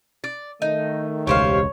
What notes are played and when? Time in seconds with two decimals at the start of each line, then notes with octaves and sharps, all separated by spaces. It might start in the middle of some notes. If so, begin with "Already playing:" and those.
0.24 D5
0.62 D#3 A3 D#4
1.27 E1 C#2 G4 C5 C#5 F5